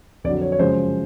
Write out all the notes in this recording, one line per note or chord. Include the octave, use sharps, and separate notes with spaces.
F2 D3 F#3 D5
C#5
C#5
F#2 C#3 F3 G#3 C5